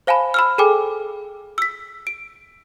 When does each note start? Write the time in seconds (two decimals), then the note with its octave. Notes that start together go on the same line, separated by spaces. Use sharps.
0.07 C5 F5 G#5 A5 B5
0.34 B5 E6 F6
0.58 G#4 A4 G5 G#5 D6
1.58 E6 B6
2.07 D7